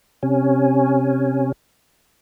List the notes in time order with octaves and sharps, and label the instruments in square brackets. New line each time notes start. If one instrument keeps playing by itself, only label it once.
[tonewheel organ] C3 C#4